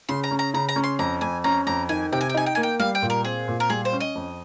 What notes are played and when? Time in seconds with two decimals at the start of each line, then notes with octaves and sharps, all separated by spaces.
0.09 C#3 C6
0.24 A#5
0.31 C#4
0.39 A#5
0.54 C#3 A#5
0.69 A#5
0.76 C#4
0.84 C6
0.99 F2 A#5
1.21 F2 G#5
1.44 C#4 A#5
1.67 F2 A#5
1.89 D#3 G#5
2.12 C3 G5
2.21 G#5
2.29 G5
2.34 D#4 G#5
2.46 G5
2.55 A#3 G#5
2.63 G5
2.80 G3 F5
2.95 G5
3.02 A#2
3.10 A#4
3.25 C4 G#4
3.48 A#2
3.60 A#4
3.70 G3 G#4
3.85 C5
3.93 C#4
4.00 D#5
4.15 F2